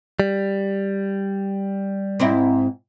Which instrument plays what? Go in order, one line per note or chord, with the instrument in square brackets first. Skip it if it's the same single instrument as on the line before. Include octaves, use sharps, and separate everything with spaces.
[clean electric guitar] G3
[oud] G#2 C4 E4